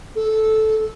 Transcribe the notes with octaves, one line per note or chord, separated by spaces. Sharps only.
A4